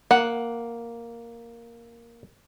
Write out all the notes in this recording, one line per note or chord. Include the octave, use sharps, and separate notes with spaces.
A#3 F#5